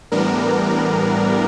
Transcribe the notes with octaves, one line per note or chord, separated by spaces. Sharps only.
A2 E3 G3 B3 D4 A#4